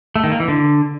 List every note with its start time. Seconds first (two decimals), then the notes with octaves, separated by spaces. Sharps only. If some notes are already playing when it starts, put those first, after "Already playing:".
0.16 A3
0.24 D#3
0.32 A#3
0.40 E3
0.48 D3